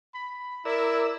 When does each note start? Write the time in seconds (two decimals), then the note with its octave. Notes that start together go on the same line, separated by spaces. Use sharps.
0.15 B5
0.65 E4 A#4 D5 E6